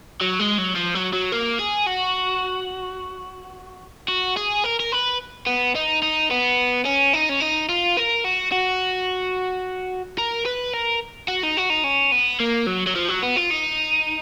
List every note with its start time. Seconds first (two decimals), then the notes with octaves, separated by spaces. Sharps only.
0.21 F#3
0.39 G#3
0.58 F#3
0.76 F3
0.95 F#3
1.13 F#3
1.32 A#3
1.59 G#4
1.87 F#4
4.08 F#4
4.37 G#4
4.64 A#4
4.80 A#4
4.92 B4
5.47 B3
5.75 D#4
6.02 D#4
6.30 B3
6.85 C#4
7.13 D#4
7.29 C#4
7.40 D#4
7.69 F4
7.97 A#4
8.24 F#4
8.52 F#4
10.18 A#4
10.45 B4
10.73 A#4
11.28 F#4
11.43 D#4
11.57 F#4
11.70 D#4
11.84 C#4
12.12 B3
12.40 A#3
12.67 F#3
12.87 F#3
12.95 F3
13.08 F#3
13.22 B3
13.36 F4
13.50 D#4